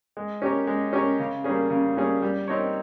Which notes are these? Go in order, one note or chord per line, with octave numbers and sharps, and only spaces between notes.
G#3
C#4 G4 A#4 C#5
G#3
C#4 G4 A#4 C#5
C#3
G3 A#3 C#4 G#4
C#3
G3 A#3 C#4 G#4
G3
C4 D#4 A#4 C#5